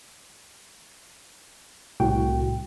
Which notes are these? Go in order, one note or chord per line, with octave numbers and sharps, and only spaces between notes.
C2 A2 F#4 G5